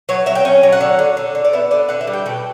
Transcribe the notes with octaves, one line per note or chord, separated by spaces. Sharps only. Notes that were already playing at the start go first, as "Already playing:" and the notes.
F#3 C#5
F#3 E5
G5
C#4
F#3
F#5
D3
D3
D3
D3
D5
B3 E5
D3 D5
D3 F#5
E5
G3
G5
B2 G5